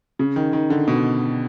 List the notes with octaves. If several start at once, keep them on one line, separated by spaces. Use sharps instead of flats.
C#3
D#3
D#3
D3
B2